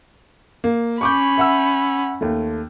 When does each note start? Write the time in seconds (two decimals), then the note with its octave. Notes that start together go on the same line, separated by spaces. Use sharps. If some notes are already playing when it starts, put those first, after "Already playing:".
0.64 A#3
1.01 C#4 B5 C#6 D6 G6
1.38 E5 F#5 E6
2.21 D#2 A3